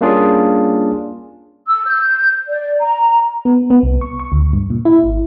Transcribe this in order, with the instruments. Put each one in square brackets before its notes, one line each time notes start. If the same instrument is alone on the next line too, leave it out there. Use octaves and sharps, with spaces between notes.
[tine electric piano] G3 A#3 C#4 D4 F4 G#4
[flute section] E6
G6
D5
A#5
[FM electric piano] B3
B3
C2
C#6
C#6
D2
G2
A#2
E4
G#1